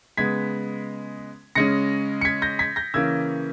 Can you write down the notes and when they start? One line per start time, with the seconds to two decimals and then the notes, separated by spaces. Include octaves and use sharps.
0.17 C#3 G#3 B3 G#6 B6
1.55 C#3 G#3 C#4 A#6 C#7
2.21 C#7
2.25 G#6 B6
2.42 G6 A#6
2.59 G#6 B6
2.76 G6 A#6
2.94 C#3 E3 A#3 C#4 E6 G#6